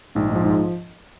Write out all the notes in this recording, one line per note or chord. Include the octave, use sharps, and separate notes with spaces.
A#1 G#2
G#2
F3
G#2